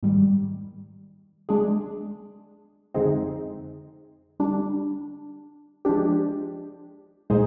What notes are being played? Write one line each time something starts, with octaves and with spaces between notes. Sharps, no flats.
G#2 D#3 G3
G#3 D4 G#4
F2 D3 G#3 C4 D#4
D3 G3 D4
F3 G#3 D4 G4
A#2 G#3 D#4 G#4 C5